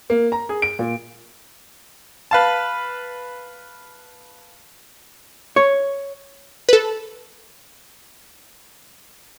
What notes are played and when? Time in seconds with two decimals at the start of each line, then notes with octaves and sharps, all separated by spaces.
0.10 A#3
0.32 A#5
0.49 G#4
0.62 D7
0.79 A#2
2.31 B4 F5 A5
5.56 C#5
6.69 A4 B4